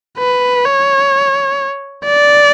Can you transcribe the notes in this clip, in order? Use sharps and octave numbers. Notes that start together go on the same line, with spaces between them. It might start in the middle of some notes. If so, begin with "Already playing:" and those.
B4
C#5
D5